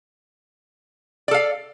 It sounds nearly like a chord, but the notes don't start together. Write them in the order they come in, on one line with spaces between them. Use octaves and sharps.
D5 A4 F5